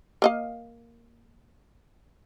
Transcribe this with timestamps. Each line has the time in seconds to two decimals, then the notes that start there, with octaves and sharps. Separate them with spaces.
0.22 A#3 D#5 F5